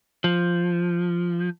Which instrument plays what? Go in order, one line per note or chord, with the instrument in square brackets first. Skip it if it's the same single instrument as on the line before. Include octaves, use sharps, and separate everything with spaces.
[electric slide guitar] F3